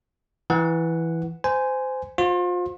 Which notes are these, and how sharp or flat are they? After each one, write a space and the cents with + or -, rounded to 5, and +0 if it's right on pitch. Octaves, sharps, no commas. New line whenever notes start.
E3 +0 F#5 +0
C5 -20 G#5 +0
F4 +35 C5 +0